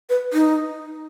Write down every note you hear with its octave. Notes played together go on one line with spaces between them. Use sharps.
B4
D#4